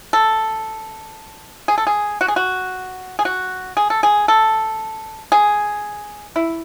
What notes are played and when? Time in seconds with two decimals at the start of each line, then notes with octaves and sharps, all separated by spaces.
0.13 A4
1.68 G#4
1.78 A4
1.87 G#4
2.21 F#4
2.28 G#4
2.36 F#4
3.19 G#4
3.25 F#4
3.77 G#4
3.90 A4
4.03 G#4
4.28 A4
5.32 G#4
6.36 E4